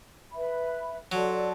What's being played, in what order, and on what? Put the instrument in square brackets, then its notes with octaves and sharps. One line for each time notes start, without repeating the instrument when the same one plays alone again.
[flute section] B4 E5 B5
[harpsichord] F#3 [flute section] A4 D5 A5 C6